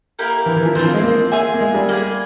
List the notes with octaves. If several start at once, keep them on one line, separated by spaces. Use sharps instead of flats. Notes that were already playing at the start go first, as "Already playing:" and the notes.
A#3 E4 G4 A#4
E3
E3
F3
E3 C4 F4 C5
F3
G#3
A#3
F4 G#4 E5 G#5
A#3
G#3
G3
A#3 E4 G#4